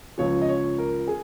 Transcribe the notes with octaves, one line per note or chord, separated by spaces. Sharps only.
C#2 C#3 F3 C#5
D#5
C#5
A#4
G#4